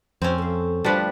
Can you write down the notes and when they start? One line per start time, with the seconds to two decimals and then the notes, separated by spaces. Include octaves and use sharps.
0.22 F2 F3 C4 C#4 E4 F#4
0.38 A4 F5
0.84 D2 F3 G3 D4 B4